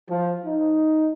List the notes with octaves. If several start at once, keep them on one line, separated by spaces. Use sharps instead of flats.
F3
D#4